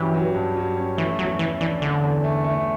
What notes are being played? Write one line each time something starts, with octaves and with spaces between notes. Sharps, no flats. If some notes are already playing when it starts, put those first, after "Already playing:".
Already playing: G2 E3 F#3 C#4 G4
F#3
G2
F#3
C#4
E3 A3
E2 F#3
E3 A3
E3 D4
D3 D4
E2
A3
A3